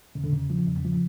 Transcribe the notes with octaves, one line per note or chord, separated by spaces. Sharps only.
E2 C#3
D3
E2 C#3
F3
E2
F3